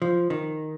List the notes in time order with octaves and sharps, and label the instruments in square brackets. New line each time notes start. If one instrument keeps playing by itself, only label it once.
[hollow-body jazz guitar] F3
D#3